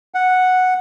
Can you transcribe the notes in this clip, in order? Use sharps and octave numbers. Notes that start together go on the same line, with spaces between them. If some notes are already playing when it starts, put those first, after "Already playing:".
F#5